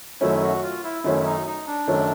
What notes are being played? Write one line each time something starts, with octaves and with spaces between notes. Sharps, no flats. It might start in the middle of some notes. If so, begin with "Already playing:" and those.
F#2 D#3 F#3 A3 C#4 E4
F#4
F4
E4
F#2 D#3 F#3 A3 C#4 E4
E4
D#4
D#4
D4
F#2 D#3 F#3 A3 C#4